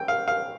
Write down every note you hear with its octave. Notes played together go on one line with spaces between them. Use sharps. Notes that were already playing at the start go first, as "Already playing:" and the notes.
Already playing: G5
F5
F5